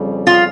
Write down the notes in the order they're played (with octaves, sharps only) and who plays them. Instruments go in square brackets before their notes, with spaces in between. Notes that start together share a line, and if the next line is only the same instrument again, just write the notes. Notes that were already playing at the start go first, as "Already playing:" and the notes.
Already playing: [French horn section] F2 C#3 G3
[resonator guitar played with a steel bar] F4